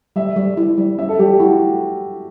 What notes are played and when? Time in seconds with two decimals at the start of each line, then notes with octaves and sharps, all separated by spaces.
0.16 G3 E5
0.36 G3
0.57 E4
0.77 G3
0.98 C#4 E5
1.09 A4
1.19 G3 G4
1.29 G4
1.39 E4 F#4